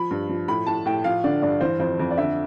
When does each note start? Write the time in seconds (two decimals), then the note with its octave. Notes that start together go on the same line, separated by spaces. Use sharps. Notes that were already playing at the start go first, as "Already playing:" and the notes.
Already playing: F3 B5
0.11 G2
0.29 F3
0.48 A2 B5
0.67 A2 A5
0.85 A2 G5
1.04 F3 F5
1.24 D3 D5
1.42 G2 D5
1.61 E3 C5
1.79 F2 C5
1.99 F2
2.10 D5
2.17 D3 E5